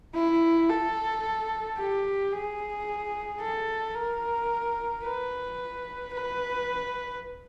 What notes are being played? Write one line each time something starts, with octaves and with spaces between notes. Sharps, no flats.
E4
A4
G4
G#4
A4
A#4
B4
B4